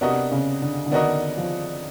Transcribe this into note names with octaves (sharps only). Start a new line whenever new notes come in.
C3 B3 D4 F#4 A#4 D#5
C#3
D3
D3
D#3 B3 D4 F#4 A#4 D#5
F3